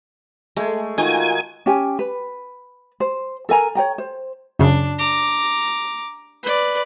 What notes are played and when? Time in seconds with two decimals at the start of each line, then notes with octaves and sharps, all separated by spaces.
0.57 G#3 A3 G#5
0.98 D#3 D#4 F4 F#4 G#5
1.66 C#4 G4 G#5
1.99 B4
3.00 C5
3.49 A4 A#4 G#5 A#5
3.75 C#5 G5 A#5
3.98 C5
4.59 F#2 C#3 D4
4.98 A#5 D6
6.43 B4 D5